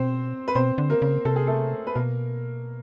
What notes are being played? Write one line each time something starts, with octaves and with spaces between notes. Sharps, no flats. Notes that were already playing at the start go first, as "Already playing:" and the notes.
Already playing: B2 C4 C5
B4
B2 C4 C5
D3
A#3 A#4
C#3
C3 A4
G#4
A3 A4
B4
B2 A#3 A#4